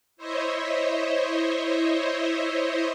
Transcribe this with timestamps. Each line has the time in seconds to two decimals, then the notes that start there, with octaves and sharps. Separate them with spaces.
0.17 E4 C5 C#5 D#5 E5